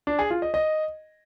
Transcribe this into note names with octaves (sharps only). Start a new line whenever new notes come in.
D4
G#4
F4
D#5
D#5